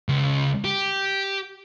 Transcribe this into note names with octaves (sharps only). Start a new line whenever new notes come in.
C#2
G4